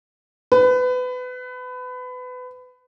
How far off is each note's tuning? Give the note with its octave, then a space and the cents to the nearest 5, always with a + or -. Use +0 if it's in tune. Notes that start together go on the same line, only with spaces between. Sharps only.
B4 +25